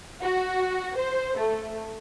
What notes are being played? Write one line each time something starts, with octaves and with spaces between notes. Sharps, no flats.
F#4
C5
A3